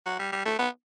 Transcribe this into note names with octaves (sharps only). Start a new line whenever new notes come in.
F#3
G3
G3
A3
B3